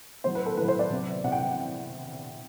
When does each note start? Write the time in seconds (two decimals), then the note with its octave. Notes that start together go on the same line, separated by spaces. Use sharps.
0.24 A2 F#3 C5
0.35 B4
0.46 A4
0.57 A2 B4
0.62 F#3
0.68 C5
0.79 D5
0.90 C3 F#3
1.24 C3 F#3 F#5
1.32 G5